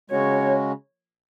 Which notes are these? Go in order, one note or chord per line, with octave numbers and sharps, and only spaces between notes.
C#3 G#3 C#4 F#4 C#5